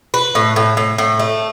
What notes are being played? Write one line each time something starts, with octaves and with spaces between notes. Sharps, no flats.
B4
A2
A2
A2
A2
A3